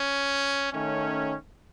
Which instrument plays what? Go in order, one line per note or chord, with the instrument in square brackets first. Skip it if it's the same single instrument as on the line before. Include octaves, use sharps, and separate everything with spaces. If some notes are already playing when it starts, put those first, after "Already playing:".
Already playing: [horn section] C#4
D#3 A3 C#4